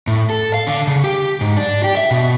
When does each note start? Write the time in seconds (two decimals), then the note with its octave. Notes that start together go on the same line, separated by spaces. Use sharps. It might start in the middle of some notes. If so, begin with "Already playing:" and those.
0.07 A2
0.30 A4
0.54 F5
0.67 D3
0.87 C#3
1.04 G4
1.41 G#2
1.57 D4
1.84 G4
1.97 E5
2.11 B2